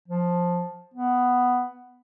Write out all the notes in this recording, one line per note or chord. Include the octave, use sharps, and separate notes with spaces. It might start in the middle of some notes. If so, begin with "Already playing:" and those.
F3
B3